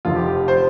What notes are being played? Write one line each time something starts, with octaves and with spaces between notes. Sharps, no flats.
F1 F2 D3 F4
G4
G4
C5